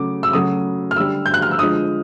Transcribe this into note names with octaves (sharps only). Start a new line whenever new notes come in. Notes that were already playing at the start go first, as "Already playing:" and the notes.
Already playing: C#3 F#3 A3 D6
E6
C#3 F#3 A3 D#6
F6
D3 G3 E6
G6
F#6
F6
E6
D3 F3 G#3 D#6